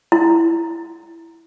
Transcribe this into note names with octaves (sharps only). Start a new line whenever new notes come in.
E4